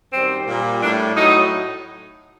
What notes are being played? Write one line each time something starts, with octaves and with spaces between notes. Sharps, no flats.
F#2 D#3 G3 C4
A#2 G3
A2 G3 D4
A2 F#3 D#4